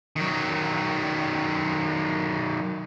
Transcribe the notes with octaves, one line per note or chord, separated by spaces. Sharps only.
D#3 F#3